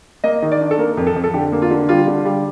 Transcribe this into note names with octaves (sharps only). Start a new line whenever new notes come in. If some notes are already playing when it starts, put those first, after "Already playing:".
A#3 D#5
D#3
D5
D4
A4
A#3 A#4
F2
A4
F2
A4
D3 G4
A#3
F4
D3
G3 F4
D3
G3